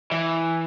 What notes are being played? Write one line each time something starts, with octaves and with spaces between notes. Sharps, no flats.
E3